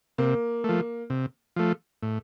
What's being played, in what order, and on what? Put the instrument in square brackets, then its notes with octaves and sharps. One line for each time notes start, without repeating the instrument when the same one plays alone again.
[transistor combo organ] C3 [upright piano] A#3
[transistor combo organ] F3 A3
C3
F3 A3
A2